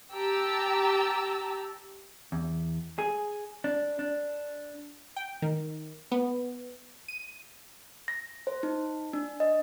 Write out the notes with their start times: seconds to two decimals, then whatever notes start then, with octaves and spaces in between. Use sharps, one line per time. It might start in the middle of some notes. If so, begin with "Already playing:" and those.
0.14 G4 A5 A#5 E6
2.32 E2
2.99 G#4
3.64 D4
3.99 D4
5.16 G5
5.42 D#3
6.12 B3
7.08 D#7
8.08 A#6
8.47 C5
8.63 D#4
9.13 D4
9.40 D#5